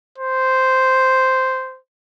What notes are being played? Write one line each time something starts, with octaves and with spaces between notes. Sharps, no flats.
C5